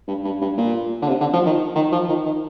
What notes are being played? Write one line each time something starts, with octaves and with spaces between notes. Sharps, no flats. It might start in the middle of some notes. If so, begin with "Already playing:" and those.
G2
G2
G2
A#2
D3
C3
D3
F3
D#3
D#3
F3
D#3
D#3